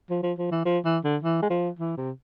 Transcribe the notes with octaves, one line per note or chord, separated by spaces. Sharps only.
F3
F3
F3
E3
F3
E3
D3
E3
G#3
F3
E3
C3